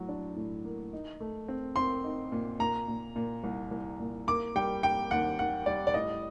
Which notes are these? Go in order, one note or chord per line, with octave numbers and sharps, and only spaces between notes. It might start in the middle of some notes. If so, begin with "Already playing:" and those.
Already playing: A2 F#3
D4
A2
A#3
D#4
A3
C4
C4 C6
D#4
A#2
A#2 A#5
A#2
A#2
C2
C2
A#2
A#3 D6
G3 G5
A#3 G5
D#2 F#5
D#3 F#5
G3 D5
D5
A2 D#5